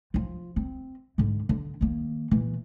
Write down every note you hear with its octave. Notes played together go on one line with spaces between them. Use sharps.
F3 F4
C4
G#2 D3
D3
D#3 A#3
A#2 E3